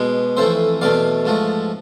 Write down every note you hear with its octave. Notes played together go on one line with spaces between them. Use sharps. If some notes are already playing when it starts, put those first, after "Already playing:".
Already playing: B2 G#3
F2 E3 A3 C5 E5
E2 B2 A3 D5 F5
G#2 F3 A3